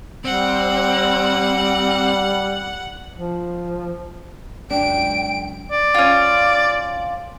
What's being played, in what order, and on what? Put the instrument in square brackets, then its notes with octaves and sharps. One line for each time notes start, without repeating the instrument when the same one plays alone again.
[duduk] G3 [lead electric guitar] C4 [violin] F#5
[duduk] F3
[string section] C#2 F#2 [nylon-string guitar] D4 [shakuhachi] G5 [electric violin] D7
[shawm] D5
[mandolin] C#4 F4